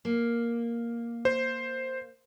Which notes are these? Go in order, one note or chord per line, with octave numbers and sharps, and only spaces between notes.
A#3
C5